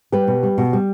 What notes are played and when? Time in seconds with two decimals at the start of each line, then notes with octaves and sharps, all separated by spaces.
0.12 G3 G4 B4
0.28 B2
0.43 G3
0.58 B2
0.73 G3